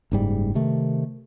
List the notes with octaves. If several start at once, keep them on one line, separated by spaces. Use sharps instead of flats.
F#1 G#2 G3
C3 D#3 A3